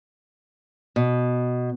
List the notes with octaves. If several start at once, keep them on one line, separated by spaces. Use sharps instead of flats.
B2